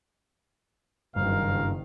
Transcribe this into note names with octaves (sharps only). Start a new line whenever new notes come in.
F#1 G2 D#3 A#4 F5